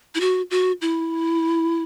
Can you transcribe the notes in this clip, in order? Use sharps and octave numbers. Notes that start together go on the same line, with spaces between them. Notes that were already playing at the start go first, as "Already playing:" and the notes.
E4
F#4
F#4
E4